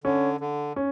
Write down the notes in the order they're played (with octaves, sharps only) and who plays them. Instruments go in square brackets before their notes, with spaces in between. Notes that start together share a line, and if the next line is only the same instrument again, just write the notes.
[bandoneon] D3 [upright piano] C#4
[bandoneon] D3
[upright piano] C#4